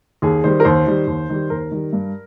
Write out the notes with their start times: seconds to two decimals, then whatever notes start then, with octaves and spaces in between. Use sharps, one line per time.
0.22 D#2 G#4
0.44 D#3 G3 C5
0.60 A#4
0.65 D#2 C5
0.87 D#3 G3
1.07 D#2
1.30 D#3 G3
1.50 D#2 A#4
1.71 D#3 G3
1.93 G2